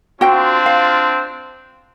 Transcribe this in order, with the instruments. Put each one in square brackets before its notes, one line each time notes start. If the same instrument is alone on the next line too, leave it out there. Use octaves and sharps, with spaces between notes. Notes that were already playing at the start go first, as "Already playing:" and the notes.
[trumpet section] C4 D4 F4 [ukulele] F#4 G5
[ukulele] F5